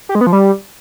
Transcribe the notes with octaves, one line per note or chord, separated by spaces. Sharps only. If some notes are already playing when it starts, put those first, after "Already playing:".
G4
G#3
B3
F3
G3